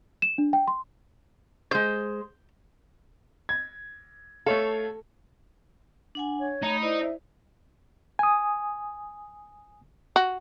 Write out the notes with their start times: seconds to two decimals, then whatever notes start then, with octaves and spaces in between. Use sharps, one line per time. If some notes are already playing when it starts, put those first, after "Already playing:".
0.22 E7
0.38 D4
0.53 G5
0.68 C6
1.71 G#3 C5 G6
3.49 G#6
4.46 A3 A4 C#5 F5
6.15 D4 F#5 G#5
6.39 C#5
6.62 A3 D#4 B5
6.82 E4 C5 D5 D#5
7.02 E5
8.19 G#5 D#6
10.16 F#4